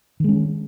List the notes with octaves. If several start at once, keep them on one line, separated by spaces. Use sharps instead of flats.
D#3 G#3 C#4